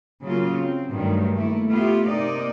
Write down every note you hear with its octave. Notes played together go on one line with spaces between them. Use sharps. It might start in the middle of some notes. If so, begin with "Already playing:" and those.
C#3 F#3 A#3 F4
C4
G2 D#3 F#3 A3
A3 A#3 E4
A3 B3 E4 F4 G4
C3 A#3 D#4 D5 D#5